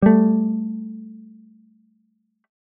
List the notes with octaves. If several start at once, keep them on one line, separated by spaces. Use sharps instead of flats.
G3 A3